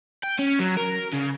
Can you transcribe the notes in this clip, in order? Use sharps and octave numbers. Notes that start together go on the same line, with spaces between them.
G5
C#4
F#3
A#4
C#3